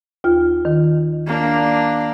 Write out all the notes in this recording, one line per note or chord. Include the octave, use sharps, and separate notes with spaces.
D#2 F4 F6
D#3
A#3 D4